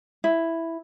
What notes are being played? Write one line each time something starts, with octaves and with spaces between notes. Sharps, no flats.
E4